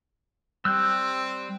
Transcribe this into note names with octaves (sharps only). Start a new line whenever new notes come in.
G3 C4 E6 F#6 G6